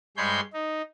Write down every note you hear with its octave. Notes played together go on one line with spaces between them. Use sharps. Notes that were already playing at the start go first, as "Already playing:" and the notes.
G2 G#3 C#5 B5 C6 G6
D#4